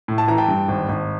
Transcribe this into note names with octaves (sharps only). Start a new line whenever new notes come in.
A2
A5
E3 A#5
G5 A5
G2
G#1
G#1